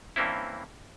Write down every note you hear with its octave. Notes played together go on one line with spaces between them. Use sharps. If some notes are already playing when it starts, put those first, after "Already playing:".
G2 E3 A#3 C4 C#4 E4